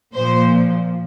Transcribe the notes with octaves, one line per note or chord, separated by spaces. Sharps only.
A#2 F3 C5